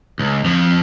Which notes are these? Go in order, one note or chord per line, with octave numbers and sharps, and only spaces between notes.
C#2
F2 F3